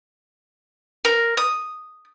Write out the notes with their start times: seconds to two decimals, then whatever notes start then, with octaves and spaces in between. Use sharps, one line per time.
1.05 A#4
1.37 D#6